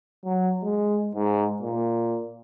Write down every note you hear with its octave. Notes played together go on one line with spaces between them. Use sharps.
F#3
G#3
G#2
A#2